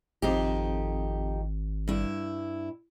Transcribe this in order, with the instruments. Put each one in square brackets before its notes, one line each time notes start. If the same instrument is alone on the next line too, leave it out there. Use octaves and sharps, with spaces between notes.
[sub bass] G#1 [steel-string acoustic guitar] F2 D#4 G4
[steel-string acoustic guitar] G2 E4